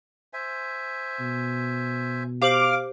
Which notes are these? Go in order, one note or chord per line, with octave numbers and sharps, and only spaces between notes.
C5 E5 G#5
B2
G4 C5 F5 D6 F#7